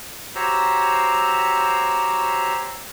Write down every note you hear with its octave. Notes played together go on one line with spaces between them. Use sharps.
F#4 G4 C5 C#5 A#5 E6